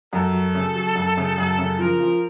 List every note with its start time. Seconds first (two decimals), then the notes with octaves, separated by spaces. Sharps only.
0.13 F#2 A4
0.33 F#3
0.55 C#3
0.75 F#3
0.95 F#2
1.17 C#3
1.38 F#2 A4
1.59 C#3
1.79 F3 A#4
2.00 F3